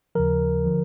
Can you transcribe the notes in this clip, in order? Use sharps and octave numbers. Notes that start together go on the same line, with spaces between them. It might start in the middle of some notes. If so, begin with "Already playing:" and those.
D#2 C#3 F3 A#4
D3 F3